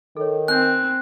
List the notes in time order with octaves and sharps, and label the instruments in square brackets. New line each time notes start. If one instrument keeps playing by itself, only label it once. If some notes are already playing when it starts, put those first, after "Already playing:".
[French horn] D#3 [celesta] A4 C#5
[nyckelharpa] C4 [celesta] G#5 G6 [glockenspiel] F#6